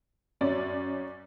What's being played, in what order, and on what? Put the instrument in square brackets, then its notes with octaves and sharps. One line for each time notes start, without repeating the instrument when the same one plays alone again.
[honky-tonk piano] F#2 C#4 D5